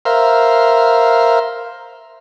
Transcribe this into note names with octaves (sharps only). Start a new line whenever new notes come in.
A#4 C5 E5 F5